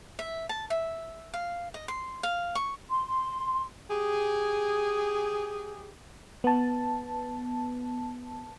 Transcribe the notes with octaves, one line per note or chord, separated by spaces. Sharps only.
E5
A5
E5
F5
D#5
C6
F5
C#6
C6
G4 G#4
B3 A5